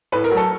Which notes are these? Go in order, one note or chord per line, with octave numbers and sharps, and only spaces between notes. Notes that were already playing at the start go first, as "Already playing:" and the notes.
A2 B4
A#4
F#3 A3
A4